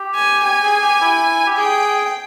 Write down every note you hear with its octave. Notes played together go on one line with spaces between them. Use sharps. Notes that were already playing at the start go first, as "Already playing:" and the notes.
Already playing: G4
G#5
G4 G#5
G#4
G4
E4
G4
G#4 G5